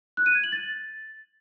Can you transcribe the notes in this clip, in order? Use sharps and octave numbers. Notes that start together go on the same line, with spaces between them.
F#6
D#7
G#6
F#7
A6